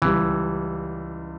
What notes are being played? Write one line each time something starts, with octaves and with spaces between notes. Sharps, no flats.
C#2 C#3 E3 G3